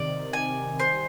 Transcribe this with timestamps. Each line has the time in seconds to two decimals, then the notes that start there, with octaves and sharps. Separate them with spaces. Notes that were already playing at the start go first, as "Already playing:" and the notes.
Already playing: C3 D#3 D5
0.33 G#5
0.80 D#3 G3 C5